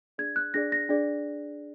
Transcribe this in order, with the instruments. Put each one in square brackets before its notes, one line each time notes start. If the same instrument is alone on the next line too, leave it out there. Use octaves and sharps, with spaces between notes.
[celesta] D4 G#4 D5 G#6
F#6
D4 G#4 D5 A#6
A#6
D4 G#4 D5